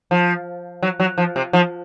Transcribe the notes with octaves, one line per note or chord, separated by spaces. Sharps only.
F3
F#3
F#3
F3
C3
F3